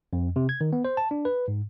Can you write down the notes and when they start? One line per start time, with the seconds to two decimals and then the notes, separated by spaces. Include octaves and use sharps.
0.13 F2
0.36 C3
0.49 G#6
0.61 D#3
0.73 B3
0.85 C5
0.97 A5
1.11 D4
1.25 B4
1.48 G#2